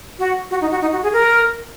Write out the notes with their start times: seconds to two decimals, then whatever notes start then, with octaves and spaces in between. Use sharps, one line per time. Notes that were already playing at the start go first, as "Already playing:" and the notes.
0.19 F#4
0.51 F#4
0.61 D#4
0.71 F#4
0.81 D#4
0.93 F#4
1.03 G#4
1.13 A#4